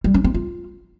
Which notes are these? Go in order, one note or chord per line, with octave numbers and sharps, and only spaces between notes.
G3
C#4
C4
F4